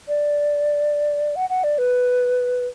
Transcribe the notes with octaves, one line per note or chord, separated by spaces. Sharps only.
D5
F#5
F#5
D5
B4